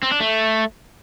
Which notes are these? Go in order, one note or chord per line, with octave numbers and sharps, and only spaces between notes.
C4
D4
A3